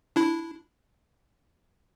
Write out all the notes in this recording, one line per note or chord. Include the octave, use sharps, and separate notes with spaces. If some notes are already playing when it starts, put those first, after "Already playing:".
D4 E4